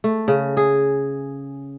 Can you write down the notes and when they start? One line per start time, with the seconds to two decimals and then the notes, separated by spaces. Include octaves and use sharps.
0.04 A3
0.28 C#3
0.57 G#4